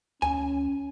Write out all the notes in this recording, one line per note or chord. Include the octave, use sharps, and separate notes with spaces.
D2 C#4 G#5